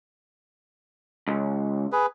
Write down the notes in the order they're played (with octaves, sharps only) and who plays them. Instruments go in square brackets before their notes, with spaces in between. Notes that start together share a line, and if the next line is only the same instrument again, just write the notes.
[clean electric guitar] C#2
[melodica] G#4 B4